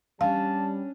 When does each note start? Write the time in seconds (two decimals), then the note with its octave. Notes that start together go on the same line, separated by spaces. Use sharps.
0.21 G3 C#4 D4 F5 A5